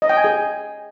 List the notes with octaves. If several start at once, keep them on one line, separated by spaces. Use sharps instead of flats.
D#5
G5
G#5
G#4